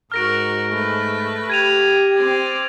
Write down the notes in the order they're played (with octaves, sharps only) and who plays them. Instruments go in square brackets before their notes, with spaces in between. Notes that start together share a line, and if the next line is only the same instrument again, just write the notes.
[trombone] G#2 [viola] F#4 A#4 [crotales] F6 A#6 D7
[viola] A3 B4
[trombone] G4 [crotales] G#6 D#7 F7
[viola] C4 D5